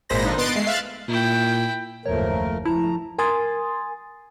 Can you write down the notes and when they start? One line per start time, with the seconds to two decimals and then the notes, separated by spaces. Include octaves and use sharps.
0.09 G#1 A#2 G#3 C5 B5 A#6
0.25 D3 F3 D4 D#4
0.38 B3 D#5 C6 F#6 A6 D7
0.56 G#3 A3 C7
0.67 E5 F5 F#6 A6
1.08 A#2 E4 G5
2.06 F#1 D#2 G#2 F3 A3 A#4 C#5
2.65 F3 A3 E4 A5 A#5
3.18 A#4 G#5 C6 D#6 A6